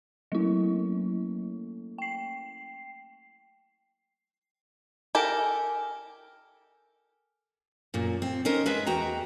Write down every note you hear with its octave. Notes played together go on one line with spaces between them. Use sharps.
F#3 A3 A#3 C#4 E4
G5 C7
G4 A4 A#4 G#5
F#2 A#2
C4
C#4 D#4 A#4 C5 D#5
G#3 B4 E5
E2 F#4 G5 A#5